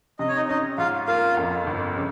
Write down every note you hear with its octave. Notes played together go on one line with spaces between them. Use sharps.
C3 D#5
C#5
D#4 D#5
C#4 D#4 D#5
G#2 F4 F5
A#3 F4 F5
F2
G1
C#3